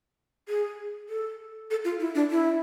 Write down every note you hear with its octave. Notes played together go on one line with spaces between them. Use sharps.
G#4
A4
A4
F4
E4
D4
E4